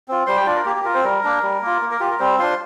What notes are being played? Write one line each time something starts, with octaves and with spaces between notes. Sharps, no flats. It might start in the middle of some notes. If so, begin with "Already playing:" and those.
C4 F4
G3 C5 C6
G4 G5
D4 F4 D5
A#4
A#3 G4
G4
F4 A#4
C4 C5
G3 A#4
A#3 D4
G3
A#3 F4
A#3
A#4
F4 G4
A#4
G3 C4 C5
D4 F4 C5 C6